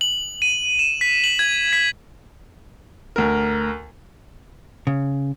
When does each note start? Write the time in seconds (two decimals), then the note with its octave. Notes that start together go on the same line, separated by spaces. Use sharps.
0.01 F#7
0.42 D#7
0.79 E7
1.01 B6
1.24 F#7
1.39 G#6
1.73 B6
3.16 D2 A#4
4.87 C#3